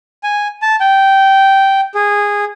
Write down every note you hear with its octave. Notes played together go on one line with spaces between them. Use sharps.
G#5
A5
G5
G#4